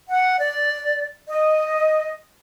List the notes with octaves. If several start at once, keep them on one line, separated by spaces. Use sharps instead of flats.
F#5
D5
D#5